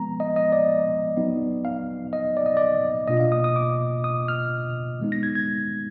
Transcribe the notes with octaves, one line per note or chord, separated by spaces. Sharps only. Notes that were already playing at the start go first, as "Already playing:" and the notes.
Already playing: F3 G#3 B3 A#5
D#5
D#5
D5
F#3 B3 D#4
F5
D#5
D5
D#5
D5
B2 A#3 D4 F4 D#5
F5
D#6
D#6
D6
D#6
F6
D#3 G#3 B3 D#4
A#6
G#6
G#6